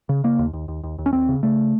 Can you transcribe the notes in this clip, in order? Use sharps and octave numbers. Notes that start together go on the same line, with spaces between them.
C#3
C#3 A#3
D#2
D#2
D#2
D#2
D#2
C#4
D#2 C4
C#3
C#3 A3